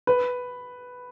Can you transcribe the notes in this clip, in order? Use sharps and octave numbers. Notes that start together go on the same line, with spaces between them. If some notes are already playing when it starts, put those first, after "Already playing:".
B4